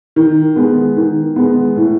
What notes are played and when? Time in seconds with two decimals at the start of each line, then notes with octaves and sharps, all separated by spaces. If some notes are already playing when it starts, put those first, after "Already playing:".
0.16 D#3
0.56 G#3 B3
0.97 D#3
1.36 G#3 B3
1.76 A2